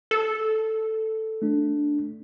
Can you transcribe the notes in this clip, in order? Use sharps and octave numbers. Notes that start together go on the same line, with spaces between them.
A4
A3 D4